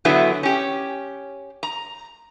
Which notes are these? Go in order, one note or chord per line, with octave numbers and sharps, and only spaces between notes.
D3 F#3 B3 E4 G#4
C#4 G4
A#5